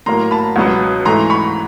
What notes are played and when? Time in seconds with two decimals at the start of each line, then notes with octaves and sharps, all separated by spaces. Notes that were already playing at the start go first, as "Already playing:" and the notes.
0.06 A2 F#3 A#3 A#5 C6
0.31 A5 B5
0.56 C#2 B2 F#3 B3
1.05 G#2 E3 A3 A#5 C6
1.30 B5 C#6